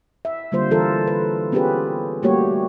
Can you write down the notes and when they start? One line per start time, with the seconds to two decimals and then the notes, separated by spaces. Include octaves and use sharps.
0.25 E5
0.52 D3 G3 A#3 F4 C5
0.71 E3 F4 A4 A#4
1.07 B4
1.52 B3 C#4 F4 G4 G#4 B4
2.23 G3 A3 A#3 F#4 G4 C#5